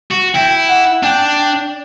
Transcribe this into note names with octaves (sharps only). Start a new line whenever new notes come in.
F#4
E4 G5
F#5
D4 G5
G5